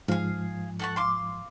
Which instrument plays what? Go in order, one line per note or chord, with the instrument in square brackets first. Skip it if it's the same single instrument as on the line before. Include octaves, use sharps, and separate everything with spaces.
[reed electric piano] G#2 F3 [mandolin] G#4 F5
[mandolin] A4 F#5 C#6
F5 C6 D6